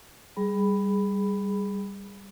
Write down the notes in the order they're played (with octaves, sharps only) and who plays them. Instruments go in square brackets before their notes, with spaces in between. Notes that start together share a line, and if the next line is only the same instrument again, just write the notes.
[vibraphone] G3 G#4 B5